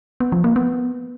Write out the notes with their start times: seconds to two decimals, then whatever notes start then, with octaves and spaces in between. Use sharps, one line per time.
0.20 B3
0.32 F3
0.44 A#3
0.56 B3